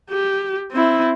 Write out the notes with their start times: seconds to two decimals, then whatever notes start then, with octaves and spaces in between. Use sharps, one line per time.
0.10 G4
0.72 C4 E4